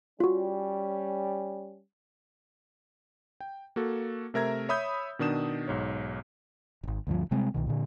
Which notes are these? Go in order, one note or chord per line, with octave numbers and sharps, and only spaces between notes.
G3 C#4 F4 F#4
G5
A#3 F#4 A4
C3 A3 A#4 E5 A#5 G#6
C#5 E5 B5 D#6 E6 G6
B2 D#3 D4 D#6 E7
B1 G#2 C#5
D#1 G#1
D2 G2 F3
C3 G3 G#3 C4
C2 B2 D#3
A#2 D3